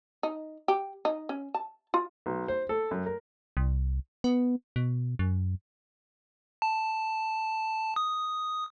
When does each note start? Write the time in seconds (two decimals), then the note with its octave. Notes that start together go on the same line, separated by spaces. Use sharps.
0.23 D#4
0.68 G4
1.05 D#4
1.29 C#4
1.54 A5
1.94 F4
2.26 B1
2.48 C5
2.69 A4
2.91 F#2
3.06 A#4
3.57 C2
4.24 B3
4.76 B2
5.19 F#2
6.62 A5
7.96 D#6